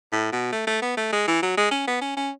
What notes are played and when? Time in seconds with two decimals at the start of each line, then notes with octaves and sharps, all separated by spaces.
0.13 A2
0.32 B2
0.53 A3
0.67 A3
0.82 B3
0.97 A3
1.13 G#3
1.28 E3
1.43 F#3
1.58 G#3
1.72 C#4
1.88 B3
2.02 C#4
2.17 C#4